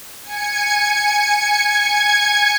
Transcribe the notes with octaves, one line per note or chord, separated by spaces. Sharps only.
G#5 G#6 C#7